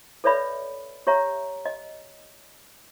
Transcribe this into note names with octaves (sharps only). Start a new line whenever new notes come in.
A4 B4 C#5 D5 E5 B5
G4 C#5 E5 A#5
D#5